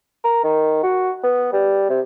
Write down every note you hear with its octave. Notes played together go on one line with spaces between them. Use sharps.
A#4
D#3
F#4
B3
G3
C3